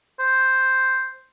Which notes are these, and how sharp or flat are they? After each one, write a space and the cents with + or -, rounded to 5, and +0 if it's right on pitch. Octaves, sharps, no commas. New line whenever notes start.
C5 +0